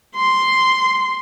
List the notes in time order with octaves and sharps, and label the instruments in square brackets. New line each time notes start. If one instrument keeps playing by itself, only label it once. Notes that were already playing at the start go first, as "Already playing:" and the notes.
[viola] C6